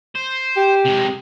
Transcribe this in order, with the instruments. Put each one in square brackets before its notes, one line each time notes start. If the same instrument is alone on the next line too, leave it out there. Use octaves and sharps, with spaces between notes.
[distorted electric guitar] C5
[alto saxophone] G4
[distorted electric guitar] C3 G#3